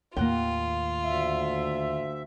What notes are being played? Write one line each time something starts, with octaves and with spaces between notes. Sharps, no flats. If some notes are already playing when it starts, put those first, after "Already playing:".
D#2 A2 A#3 F4 F#5 G5
D2 E5